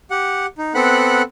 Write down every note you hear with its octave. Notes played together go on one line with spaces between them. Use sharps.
G4 F#5
D#4
B3 C4 A4 F#5 B5 F#6